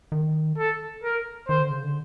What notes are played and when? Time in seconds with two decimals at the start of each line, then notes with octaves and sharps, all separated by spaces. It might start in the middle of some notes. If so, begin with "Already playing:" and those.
0.12 D#3
0.58 A4
1.04 A#4
1.49 D#3 C5
1.60 D3
1.71 C#3
1.83 D3